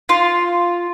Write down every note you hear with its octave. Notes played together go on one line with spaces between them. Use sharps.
F4